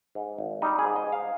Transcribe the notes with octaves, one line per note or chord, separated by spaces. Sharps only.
G#2
G#1
G3 D#4
G#4
G#2
D#5
G#2
F5